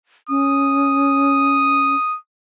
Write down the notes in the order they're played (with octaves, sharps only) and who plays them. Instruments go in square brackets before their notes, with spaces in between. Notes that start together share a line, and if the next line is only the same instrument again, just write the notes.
[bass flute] C#4 [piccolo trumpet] D#6